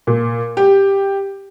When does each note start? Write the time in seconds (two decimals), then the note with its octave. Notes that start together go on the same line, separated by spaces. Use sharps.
0.07 A#2
0.57 G4